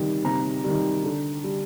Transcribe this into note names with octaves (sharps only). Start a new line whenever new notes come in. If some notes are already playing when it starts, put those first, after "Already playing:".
Already playing: C3 D#3 G3
C3 A#5
D#3 G3
D3
G3